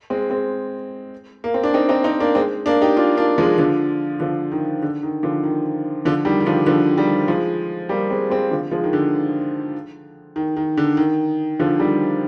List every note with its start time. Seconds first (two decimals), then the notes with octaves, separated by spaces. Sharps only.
0.10 G#3 C4
0.30 G#3 C4
1.44 A#3
1.54 C4
1.64 D4
1.74 C4 D#4
1.89 C4 D#4
2.04 C4 D#4
2.20 A#3 D4
2.35 G#3 C4
2.66 A#3 D4
2.82 D#4 G4
2.97 D4 F4
3.17 A#3 D4
3.38 F3 G#3
3.58 D3 F3
4.20 D3 F3
4.52 D#3
4.82 D3
5.03 D#3
5.23 D3 F3
5.43 D#3
6.05 D3 F3
6.25 D#3 G3
6.40 D#3
6.46 D3 F3
6.66 D3 F3
6.97 D#3 G3
7.28 F3 G#3
7.89 G3 A#3
8.10 G#3 C4
8.30 G#3 C4
8.51 D3 F3
8.71 F3 G#3
8.84 D#3
8.93 D3
10.36 D#3
10.56 D#3
10.77 D3
10.97 D#3
11.60 D3 F3
11.80 D#3 G3